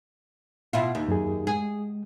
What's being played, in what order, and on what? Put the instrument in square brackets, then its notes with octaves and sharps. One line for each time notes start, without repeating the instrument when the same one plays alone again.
[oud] B2 E4 F4
D#2
[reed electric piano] F#2 G#4
[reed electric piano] G#3 [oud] G#4